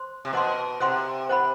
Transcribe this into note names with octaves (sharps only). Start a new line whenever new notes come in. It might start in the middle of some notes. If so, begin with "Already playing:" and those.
Already playing: C5 C6
C3
B2 C5 F#5 C6
C3 C5 F#5 C6
C5 F#5 B5